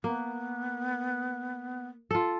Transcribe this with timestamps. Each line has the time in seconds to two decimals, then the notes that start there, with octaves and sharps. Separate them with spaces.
0.04 A#3 B3
2.11 F4 A4